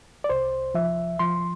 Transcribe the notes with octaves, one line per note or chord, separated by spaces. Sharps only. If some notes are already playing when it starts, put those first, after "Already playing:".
D5
C2 C5
F3 E5
F3 C6